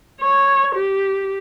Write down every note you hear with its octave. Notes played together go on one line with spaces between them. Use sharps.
C#5
G4